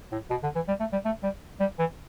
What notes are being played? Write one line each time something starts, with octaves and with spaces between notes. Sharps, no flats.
A2
B2
D3
E3
G3
A3
G3
A3
G3
G3
E3